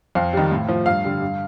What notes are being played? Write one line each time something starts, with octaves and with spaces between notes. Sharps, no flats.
F2 F5
D#3 G3
A2
F3
G2 F5
D3 G3
G2